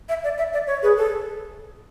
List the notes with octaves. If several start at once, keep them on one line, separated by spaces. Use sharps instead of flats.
E5
D5
E5
D5
C#5
G#4 B4
A4